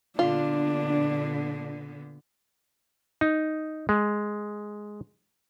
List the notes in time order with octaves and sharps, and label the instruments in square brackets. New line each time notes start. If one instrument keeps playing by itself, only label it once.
[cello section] A#2 D3 B3 [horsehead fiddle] D4 [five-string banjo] F4
[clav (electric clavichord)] D#4
G#3